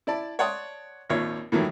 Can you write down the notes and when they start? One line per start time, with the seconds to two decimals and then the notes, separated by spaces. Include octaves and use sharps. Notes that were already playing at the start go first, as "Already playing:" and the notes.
0.07 E4 D5 A5
0.39 C#5 D5 F#5 A5 C6 D#6
1.09 G#1 D#2 A#2 C#5
1.52 A2 D#3 E3 F#3